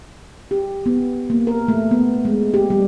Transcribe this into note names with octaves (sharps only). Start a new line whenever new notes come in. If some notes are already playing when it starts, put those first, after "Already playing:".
G4
B3
A#3
A#4
A3
B3
G#3
G4
G3